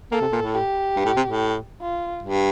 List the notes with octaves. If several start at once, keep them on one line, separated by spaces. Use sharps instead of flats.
A#3 A4
C3
A#2
A2
G4
G2
A2
C3
A2
F4
G2